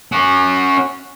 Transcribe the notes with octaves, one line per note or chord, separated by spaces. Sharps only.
C#4 F#4